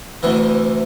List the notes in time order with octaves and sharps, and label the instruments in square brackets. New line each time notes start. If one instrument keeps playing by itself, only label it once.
[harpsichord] D2 C3 E3